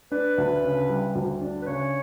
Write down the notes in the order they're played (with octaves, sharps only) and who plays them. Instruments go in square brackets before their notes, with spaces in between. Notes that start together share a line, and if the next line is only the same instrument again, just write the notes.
[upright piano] D4 [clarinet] B4
[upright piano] D2
C#3
G3
D2
D4
[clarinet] B4
[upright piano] C#3 [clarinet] C#5